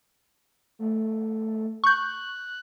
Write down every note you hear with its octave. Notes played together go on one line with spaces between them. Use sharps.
A3
C#6 F#6 G6